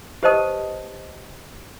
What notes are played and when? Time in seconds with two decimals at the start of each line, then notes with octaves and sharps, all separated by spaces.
0.23 G4 B4 C5 D#5 A5 D#6